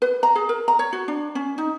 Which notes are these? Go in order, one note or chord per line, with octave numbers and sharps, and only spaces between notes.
B4
A#5
G#4
A#4
A#5
C#5
F#4
D4
C#4
D#4